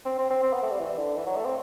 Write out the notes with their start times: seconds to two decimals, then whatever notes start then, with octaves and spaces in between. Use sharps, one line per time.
0.06 C4
0.19 C4
0.31 C4
0.43 C4
0.53 B3
0.62 A3
0.71 G3
0.81 E3
0.98 D3
1.17 E3
1.27 F#3
1.36 A3
1.45 C4